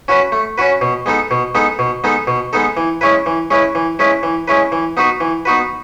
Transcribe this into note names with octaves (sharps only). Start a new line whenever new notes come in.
C#4 F#4 B4
A3
C#4 F#4 B4
B2
G#3 B3 D#4 A4
B2
G#3 B3 D#4 A4
B2
G#3 B3 D#4 A4
B2
G#3 B3 D#4 A4
E3
G#3 C#4 E4 B4
E3
G#3 C#4 E4 B4
E3
G#3 C#4 E4 B4
E3
G#3 C#4 E4 B4
E3
B3 D#4 F#4 B4
E3
B3 D#4 F#4 B4